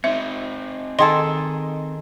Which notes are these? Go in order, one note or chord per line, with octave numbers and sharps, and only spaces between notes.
C4 D#4 E5
D#3 G#4 A4 D#5 G5 A5 C6